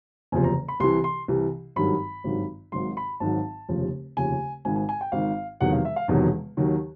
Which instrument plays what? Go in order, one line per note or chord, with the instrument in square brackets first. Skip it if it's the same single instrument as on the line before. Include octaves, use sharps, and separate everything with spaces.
[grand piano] F#1 E2 C3 F3 G#5
A#5
B5
C2 C3 E3 C6
C6
C2 C3 E3
G#1 G2 D#3 F#3 B5
G#1 G2 D#3 F#3
G#1 G#2 D#3 F#3 C6
B5
G#1 G#2 D#3 F#3 A5
F1 D#2 C#3 F3
F1 D#2 C#3 F3 G#5
G#1 G#2 D#3 G#5
G#5
G#5
G5
G#1 G#2 D#3 F5
E1 E2 C3 D#3 F#3 F#5
F5
E5
F5
E1 E2 C3 D#3 F#3
D#2 D#3 F#3